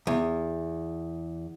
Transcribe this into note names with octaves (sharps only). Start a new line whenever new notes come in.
E2